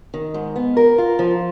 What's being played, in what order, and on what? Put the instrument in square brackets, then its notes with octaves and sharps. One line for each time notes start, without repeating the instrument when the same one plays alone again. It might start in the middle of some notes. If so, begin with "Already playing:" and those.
[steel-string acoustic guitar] D#3
G#2
B3
A#4
F4
F3